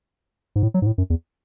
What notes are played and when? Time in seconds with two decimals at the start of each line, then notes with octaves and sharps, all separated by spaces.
0.56 G#2
0.63 A2
0.74 F#3
0.82 G#2
0.86 A2
0.98 F#2
1.10 E2